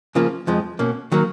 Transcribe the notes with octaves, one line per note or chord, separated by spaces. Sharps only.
C#3 F3 A#3 F4
F2 F3 G#3
B2 A#3 C#4
D#3 F#3 A#3